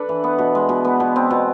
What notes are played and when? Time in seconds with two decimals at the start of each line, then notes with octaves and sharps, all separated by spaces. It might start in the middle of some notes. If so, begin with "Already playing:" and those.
Already playing: D4 A4 B4
0.09 E3
0.24 B3
0.38 B2
0.55 G#3
0.69 B2
0.85 B3
1.00 B2
1.16 C4
1.31 B2